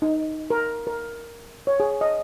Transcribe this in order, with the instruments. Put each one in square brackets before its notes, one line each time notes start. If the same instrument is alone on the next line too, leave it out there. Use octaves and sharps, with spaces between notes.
[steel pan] D#4
A#4
A#4
C#5
G#4
D#5